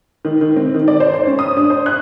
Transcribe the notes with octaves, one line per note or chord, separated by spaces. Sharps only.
D#3
D#3
C4
D#3
D5
C5
C5
C#4
D#6
D4
C5
F#6